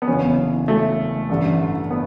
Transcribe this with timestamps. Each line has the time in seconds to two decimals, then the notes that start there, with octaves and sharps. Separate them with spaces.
0.02 B3
0.07 F#1 E2 D3 C#4
0.68 A3
1.29 A1 G2 D3
1.90 B3